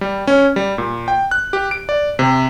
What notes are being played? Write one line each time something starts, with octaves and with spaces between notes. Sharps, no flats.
G3
C#4
G3
A#2
G5
F#6
G4
D7
D5
C3